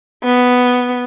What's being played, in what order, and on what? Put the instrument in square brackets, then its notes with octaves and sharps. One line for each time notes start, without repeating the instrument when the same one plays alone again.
[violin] B3